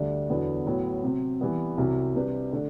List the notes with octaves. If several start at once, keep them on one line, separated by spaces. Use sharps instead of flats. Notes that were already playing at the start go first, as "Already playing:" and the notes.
Already playing: D2 D3 G3 D4
E2 D3 F#3 B3
A2 F#3 B3
C3 F#3 C4
E3 G3 B3
C2 C3 F#3
C3 G3 D4 G4 B4
D3 A3 D4